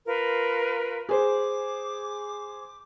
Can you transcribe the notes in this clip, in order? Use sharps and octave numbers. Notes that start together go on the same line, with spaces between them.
F4 A#4 B4
G#4 C5 D6